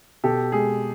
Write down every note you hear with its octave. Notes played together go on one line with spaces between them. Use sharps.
B2 G4 A4
G#3 G#4